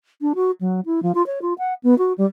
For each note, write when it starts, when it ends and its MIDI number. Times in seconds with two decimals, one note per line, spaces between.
0.21 0.33 62
0.35 0.51 66
0.61 0.81 54
0.86 1.02 64
1.03 1.12 53
1.15 1.25 65
1.26 1.39 73
1.42 1.54 65
1.58 1.74 78
1.83 1.97 59
1.98 2.13 66
2.18 2.25 55